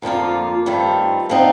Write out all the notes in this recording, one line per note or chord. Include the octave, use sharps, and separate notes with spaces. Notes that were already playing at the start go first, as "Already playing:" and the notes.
F2 D3 F3 A#3 F4
G2 D#3 A3 C4 F4
D3 F3 C4 D#4